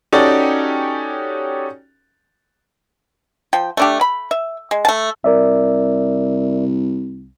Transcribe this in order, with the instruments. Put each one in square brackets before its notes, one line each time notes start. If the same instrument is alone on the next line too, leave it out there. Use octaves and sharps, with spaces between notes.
[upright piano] C#4 D#4 F#4 G4 A4 D5
[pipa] F3 G5
A3 D4 G4
B5
E5
G#3
A3 A5
[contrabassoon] C2 [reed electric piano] A#4 D5 E5